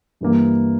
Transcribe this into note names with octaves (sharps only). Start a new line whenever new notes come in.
G2 E3 A#3